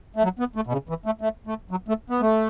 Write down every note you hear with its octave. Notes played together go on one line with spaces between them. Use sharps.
A3
F#3
B3
A3
B2
C#3
E3
A3
A3
A3
F#3
A3
B3
A3